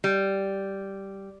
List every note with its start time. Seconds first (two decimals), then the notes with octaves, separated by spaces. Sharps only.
0.04 G3